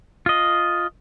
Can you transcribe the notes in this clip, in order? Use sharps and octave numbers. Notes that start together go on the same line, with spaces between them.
F4 D#5